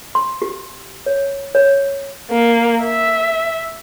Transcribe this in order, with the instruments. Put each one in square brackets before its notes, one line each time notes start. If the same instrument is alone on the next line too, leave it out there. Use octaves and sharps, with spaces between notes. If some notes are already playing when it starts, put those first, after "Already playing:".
[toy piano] C6
G4
C#5
C#5
[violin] A#3
E5